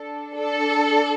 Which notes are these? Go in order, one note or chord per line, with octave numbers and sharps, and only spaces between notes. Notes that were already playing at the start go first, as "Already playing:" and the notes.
Already playing: D4 A4
A4